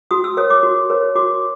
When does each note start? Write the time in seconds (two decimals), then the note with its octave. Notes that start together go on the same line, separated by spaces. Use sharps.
0.11 F#4 D#6
0.24 E6
0.37 A#4 C#5 D#6
0.50 D6
0.63 F#4
0.90 A#4 C#5
1.16 F#4 D6